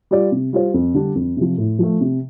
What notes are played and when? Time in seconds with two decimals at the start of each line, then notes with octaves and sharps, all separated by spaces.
0.11 G3 F4 D5
0.32 C3
0.53 G3 F4 C5
0.74 F2
0.94 D3 G3 D4
1.15 F2
1.37 C3 F3
1.58 A2
1.79 F3 A3
2.01 C3